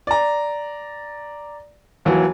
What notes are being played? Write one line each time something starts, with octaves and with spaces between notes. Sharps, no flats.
D5 A#5
D#2 E3 F#3